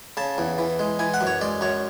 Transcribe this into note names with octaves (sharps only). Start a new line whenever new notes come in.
C#3 A5
E2
E3
G#3
E3 G#5
F#5
F#2
C#5
G#3 D5
F#2 C#5